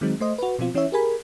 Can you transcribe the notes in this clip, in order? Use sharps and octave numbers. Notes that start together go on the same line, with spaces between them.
D#3 F#3 G#3 C4 D#4
A3 C5 D#5
F#4 B4
B2 F3 C4 F4
E3 C#4 E4 C#5 E5
G4 G#4 A#4 G#5 B5